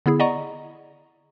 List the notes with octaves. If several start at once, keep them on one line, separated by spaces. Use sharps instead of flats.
D3 B3 E4 G#4
D5 D#5 F#5 A#5 C#6